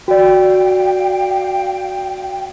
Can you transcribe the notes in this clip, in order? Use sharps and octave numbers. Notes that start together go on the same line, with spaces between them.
F#4 D5 F5 G5